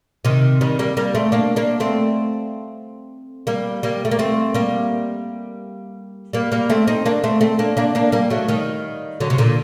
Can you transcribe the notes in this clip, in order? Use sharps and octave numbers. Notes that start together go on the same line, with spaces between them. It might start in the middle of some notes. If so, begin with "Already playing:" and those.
C3 D#3
D#3 G3
G3 A#3
G3 A#3
A3 C4
A#3 D4
A#3 D4
A3 C4
G3 A#3
G3 A#3
A3
A#3
A3 C4
G3 A#3
G3 A#3
G3 A#3
A3 C4
C4 D#4
A#3 D4
A3 C4
A3 C4
A#3 D4
A#3 D4
A#3 D4
G3 A#3
F#3 A3
D#3 G3
D3 F#3
C3
A#2 D3